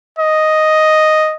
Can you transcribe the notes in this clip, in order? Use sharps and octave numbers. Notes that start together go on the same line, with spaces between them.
D#5